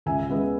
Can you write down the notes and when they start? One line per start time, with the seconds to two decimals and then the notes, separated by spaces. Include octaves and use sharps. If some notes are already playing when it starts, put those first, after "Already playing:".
0.06 C#2 E5 G#5
0.30 C#3 G#3 B3 B4